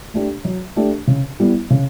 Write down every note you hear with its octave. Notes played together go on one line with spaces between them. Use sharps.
A3 D4 G4
F#3
A3 D4 G4
C#3
G3 B3 E4
C#3